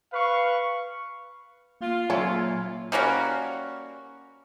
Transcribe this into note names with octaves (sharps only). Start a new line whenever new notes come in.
B4 F5 C#6
A#3 F4
A#2 F#3 C#4 E4
G3 A#3 C#4 F#4